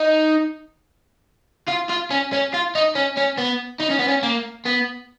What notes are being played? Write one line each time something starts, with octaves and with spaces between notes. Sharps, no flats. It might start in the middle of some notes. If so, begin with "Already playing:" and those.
Already playing: D#4
F4
F4
C#4
C#4
F4
D#4
C#4
C#4
B3
D#4
C#4
B3
C#4
A#3
B3